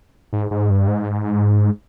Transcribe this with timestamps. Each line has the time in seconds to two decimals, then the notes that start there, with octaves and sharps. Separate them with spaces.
0.33 G#2
0.51 G#2
0.70 G2
0.88 G#2